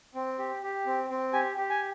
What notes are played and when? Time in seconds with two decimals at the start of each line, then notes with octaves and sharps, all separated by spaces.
0.15 C4
0.39 G4
0.62 G4
0.86 C4
1.10 C4
1.33 G4 G#5
1.57 G4
1.70 G#5